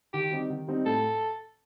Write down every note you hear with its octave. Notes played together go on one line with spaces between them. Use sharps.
D#3 G4
G3 C4 D#4
D#3
G3 C4 D#4
A2 A4